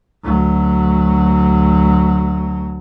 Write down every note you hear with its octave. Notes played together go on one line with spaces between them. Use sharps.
D2 F#3